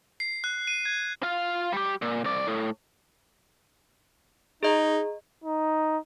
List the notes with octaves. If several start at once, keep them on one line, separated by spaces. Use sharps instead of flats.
C7
F#6
D#7
G#6
F4 F5
G3 G4
A#2
C2 D5
A2
D#4 G#4 D#5 A#5
D#4